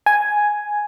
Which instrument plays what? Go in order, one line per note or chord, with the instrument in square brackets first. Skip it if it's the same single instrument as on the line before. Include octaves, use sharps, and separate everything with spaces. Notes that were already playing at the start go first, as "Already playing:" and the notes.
[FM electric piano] G#5